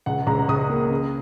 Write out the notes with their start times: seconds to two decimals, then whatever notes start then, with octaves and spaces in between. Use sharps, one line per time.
0.06 C#2 F#5
0.27 C#2 A#5
0.48 C#2 D#6
0.70 A#3
0.90 C#3